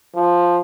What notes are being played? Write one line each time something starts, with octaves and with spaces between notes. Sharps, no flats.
F3